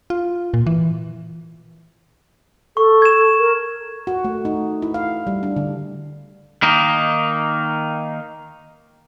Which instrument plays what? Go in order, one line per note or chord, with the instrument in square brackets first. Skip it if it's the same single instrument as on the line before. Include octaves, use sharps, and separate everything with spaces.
[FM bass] F4
A#2
E3
[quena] A4 [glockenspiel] C#6
[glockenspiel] G#6 E7
[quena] A#4
[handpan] F#4
A3
D#4
E4
F5
G3
D4
D3
[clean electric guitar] D#3 A#3 D#4